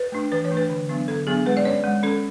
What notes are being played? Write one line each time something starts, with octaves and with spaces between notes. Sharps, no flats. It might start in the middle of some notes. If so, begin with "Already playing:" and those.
Already playing: B4
A3 D4
E3 B4
C#5
A3 D4
B4
D3
F#3 B3 D4
D3 A4
F#3 B3 D4 G#4
G#3 B4
D5
C#4 C#5
G#3
C#4 A4